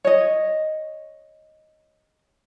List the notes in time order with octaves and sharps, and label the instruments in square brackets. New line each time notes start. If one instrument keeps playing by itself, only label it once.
[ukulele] C#5 D#5